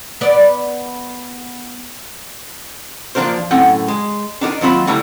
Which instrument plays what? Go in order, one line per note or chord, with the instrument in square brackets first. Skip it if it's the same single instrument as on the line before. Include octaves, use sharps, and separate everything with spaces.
[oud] B3 D5
[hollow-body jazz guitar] F3 A#3 D4 A#4 C5
F#2 A2 C4 F#5 G5
G#3
D4 D#4 F#4 A#4
D#2 F#3 C4 F4 B5
D3 G3 A3 E4 A#5